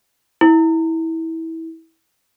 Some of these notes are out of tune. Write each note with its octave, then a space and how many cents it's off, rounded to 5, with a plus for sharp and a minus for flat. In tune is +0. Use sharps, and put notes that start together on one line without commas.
E4 -20